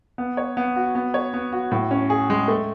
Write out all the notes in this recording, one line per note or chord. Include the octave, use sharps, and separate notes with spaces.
B3
C#5
B3
F#4
B3
C#5
B3
F#4
A2
C#4
G#4
G#3
A3